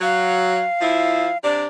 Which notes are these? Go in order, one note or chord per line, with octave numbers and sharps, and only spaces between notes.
F#3 F5
F3 E4
C3 D4 D5